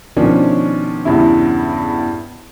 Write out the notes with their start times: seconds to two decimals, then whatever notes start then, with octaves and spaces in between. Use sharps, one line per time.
0.16 B2 D#3 F3 C#4 D4
1.05 E2 G2 C#3 E4